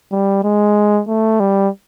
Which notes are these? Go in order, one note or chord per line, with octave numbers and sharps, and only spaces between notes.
G3
G#3
A3
G3